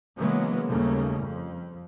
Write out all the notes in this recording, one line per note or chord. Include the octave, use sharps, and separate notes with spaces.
C#3 E3 F#3 G#3 A#3 B3
D#2 C#3 G3 A3 A#3
F2